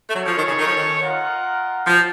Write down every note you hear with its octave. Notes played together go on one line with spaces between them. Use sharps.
A3
F#3 C#4 A4 C#5
F3
D#3
C#3
D#3
F3
D#3
F4 A#4 D#5 F#5
F3